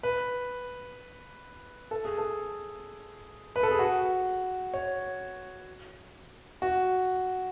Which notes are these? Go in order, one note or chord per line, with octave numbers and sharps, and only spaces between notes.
B4
A4
G#4
A4
B4
A4
G#4
F#4
C#5
F#4